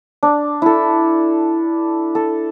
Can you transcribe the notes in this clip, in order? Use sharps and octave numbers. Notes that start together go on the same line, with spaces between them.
D4
E4 A4
A4